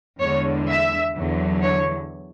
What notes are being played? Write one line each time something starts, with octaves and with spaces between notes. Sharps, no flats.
E2 D3 G#3 C#5
E5
E2 D3 F#3
C#5